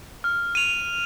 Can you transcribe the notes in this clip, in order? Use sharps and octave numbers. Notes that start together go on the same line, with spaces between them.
F6
D#7 F7